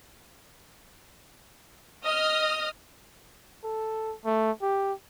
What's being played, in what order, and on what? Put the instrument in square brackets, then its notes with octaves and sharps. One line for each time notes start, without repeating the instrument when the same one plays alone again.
[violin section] D#5 D#6 F6
[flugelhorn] A4
A3
G4